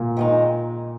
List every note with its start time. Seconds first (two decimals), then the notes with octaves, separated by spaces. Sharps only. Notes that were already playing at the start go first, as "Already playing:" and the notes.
Already playing: A#2 A#3
0.17 D#3 G#3 D#4